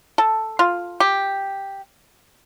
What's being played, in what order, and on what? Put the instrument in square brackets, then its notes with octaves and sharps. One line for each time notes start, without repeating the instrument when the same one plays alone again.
[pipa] A4
F4
G4